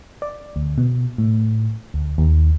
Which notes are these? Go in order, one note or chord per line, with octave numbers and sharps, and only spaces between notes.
D5
D2
B2
A2
D2
D#2